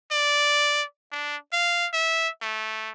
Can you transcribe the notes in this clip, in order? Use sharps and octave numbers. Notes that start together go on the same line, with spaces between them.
D5
D4
F5
E5
A3